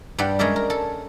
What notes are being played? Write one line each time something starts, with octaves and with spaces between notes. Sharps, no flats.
G2 G3 D5 F#5
G#3 C#4 A#4 D5 E5
A#4
A4